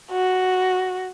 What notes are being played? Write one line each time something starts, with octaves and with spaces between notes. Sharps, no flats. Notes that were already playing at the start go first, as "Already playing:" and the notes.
F#4